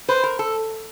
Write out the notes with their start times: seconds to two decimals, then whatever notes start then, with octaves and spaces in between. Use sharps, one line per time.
0.09 B4 C5
0.23 A#4
0.39 A4